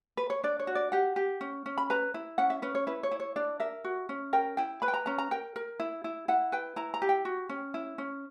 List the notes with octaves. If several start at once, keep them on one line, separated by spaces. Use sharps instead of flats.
B4
C#5
D4 D5
C#5
F#4
D5
G4 F#5
G4
C#4
C#4
B5
B4 A#5
E4
C#4 F#5
E5
C#4 B4
C#5
E4 B4
C#5
E4
C#5
D4 D5
A#4 E5
F#4
C#4
A#4 G5
E4 G5
B4 B5
G5
A#5
C#4 A#5
A#5
A#4 G5
A#4
E4
E4
E4 F#5
B4 G5
E4 A#5
A#5
G4
G5
F#4
C#4
E4
C#4